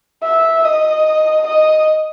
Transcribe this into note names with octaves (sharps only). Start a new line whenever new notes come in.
E5
D#5
D#5